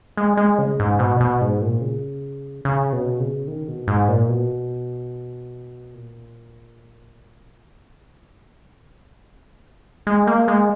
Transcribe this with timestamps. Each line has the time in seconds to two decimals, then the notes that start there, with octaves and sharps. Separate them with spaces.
0.17 G#3
0.37 G#3
0.59 C#3
0.80 G#2
0.99 B2
1.21 B2
1.41 G#2
1.62 A#2
1.82 C#3
2.65 C#3
2.93 B2
3.20 C#3
3.48 D#3
3.68 B2
3.88 G#2
4.08 A#2
4.29 B2
5.94 A#2
10.07 G#3
10.27 A#3
10.48 G#3